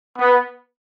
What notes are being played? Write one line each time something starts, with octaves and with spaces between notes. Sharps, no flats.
B3